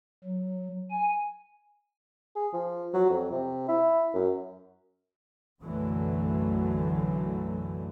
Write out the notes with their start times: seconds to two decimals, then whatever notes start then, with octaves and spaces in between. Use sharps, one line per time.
0.24 F#3
0.90 G#5
2.36 G#4
2.53 F3
2.93 F#3
3.10 F2
3.32 C3
3.68 E4
4.14 F#2
5.60 B1 F#2 D3 E3 F#3 A3